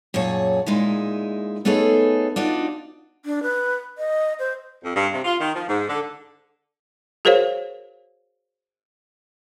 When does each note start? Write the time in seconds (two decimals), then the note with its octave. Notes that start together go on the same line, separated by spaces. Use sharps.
0.14 F#2 A#2 G#4 C#5 A5
0.66 A#2 G#3 D#4 E4
1.65 A3 B3 D#4 G#4 A4 C#5
2.36 D4 D#4 F4 F#4 D5
3.25 D4
3.43 B4
3.98 D#5
4.39 C5
4.83 F2
4.95 G2
5.12 C3
5.24 F4
5.39 D#3
5.54 F3
5.67 G#2
5.88 D3
7.25 F#4 G#4 A#4 C5 C#5 F5